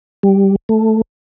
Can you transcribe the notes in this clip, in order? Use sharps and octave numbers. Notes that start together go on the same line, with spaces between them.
G3
A3